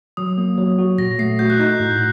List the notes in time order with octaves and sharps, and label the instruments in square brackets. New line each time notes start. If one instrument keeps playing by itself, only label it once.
[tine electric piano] F#3 [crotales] D#6
[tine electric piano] A#3
F#3
F#4
[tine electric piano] A#2 [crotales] A#6
[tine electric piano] A3 [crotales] C7
[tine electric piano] F#4 [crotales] G6
[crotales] F#6
[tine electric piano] D#4 [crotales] G6
[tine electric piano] A2